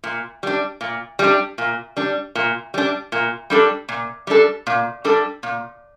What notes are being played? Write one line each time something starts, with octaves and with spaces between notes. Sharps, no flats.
A#2
G3 D4
A#2
G3 D4
A#2
G3 D4
A#2
G3 D4
A#2
G3 D4 A4
A#2
G3 D4 A4
A#2
G3 D4 A4
A#2